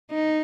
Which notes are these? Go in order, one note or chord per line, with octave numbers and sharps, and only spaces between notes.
D#4